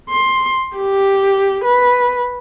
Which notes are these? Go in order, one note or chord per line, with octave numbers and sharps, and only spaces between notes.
C6
G4
B4